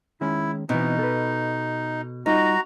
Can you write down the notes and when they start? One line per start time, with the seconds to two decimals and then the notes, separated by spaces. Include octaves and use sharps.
0.21 D#3 G#3 C#4 E4
0.69 B2 E3 B3 C4 D#4
0.99 A4 B4
2.26 G3 D#4 F4 F#4 D#5 A#5